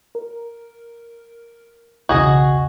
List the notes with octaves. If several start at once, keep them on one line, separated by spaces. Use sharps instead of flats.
A#4
B1 E2 C#3 F#4 G#4 D#5